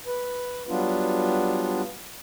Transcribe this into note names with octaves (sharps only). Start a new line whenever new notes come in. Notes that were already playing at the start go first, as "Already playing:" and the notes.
B4
F#3 G3 B3 D4 F4